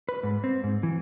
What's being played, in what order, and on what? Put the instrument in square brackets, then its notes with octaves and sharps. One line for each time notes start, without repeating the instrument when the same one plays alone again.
[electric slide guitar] B4
G#2
C4
G#2
E3